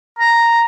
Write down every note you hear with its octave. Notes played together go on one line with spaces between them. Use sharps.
A#5